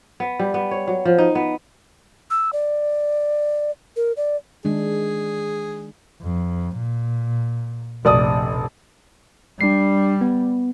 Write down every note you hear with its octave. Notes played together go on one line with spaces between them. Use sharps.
B3
G3
B3
C#5
F#3
F3
D#4
B3
E6
D5
A#4
D5
D#3 G#3 D4 G#4
F2
A#2
F1 A#1 C3 D5 D#6
G3 D4 C7
B3